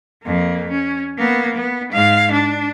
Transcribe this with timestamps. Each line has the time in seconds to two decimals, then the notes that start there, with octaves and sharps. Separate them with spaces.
0.24 F2 A#3
0.71 C#4
1.18 A#3 B3
1.56 B3
1.93 G#2 F5
2.33 D4